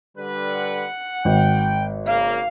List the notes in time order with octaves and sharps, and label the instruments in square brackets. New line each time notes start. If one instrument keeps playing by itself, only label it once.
[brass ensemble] D3 G3 B4
[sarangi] F#5
[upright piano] G#1 [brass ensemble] G5
[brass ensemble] C#3 A#3 [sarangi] F5